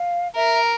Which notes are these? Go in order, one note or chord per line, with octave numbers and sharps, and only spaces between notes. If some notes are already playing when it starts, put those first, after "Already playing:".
Already playing: F5
A#4 E5